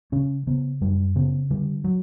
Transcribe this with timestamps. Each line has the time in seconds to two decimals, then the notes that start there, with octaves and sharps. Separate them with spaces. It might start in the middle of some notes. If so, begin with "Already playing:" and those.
0.12 C#3 C#4
0.47 C#3 B3
0.81 F#2 G3
1.16 C#3 B3
1.50 D3 G3
1.84 F#3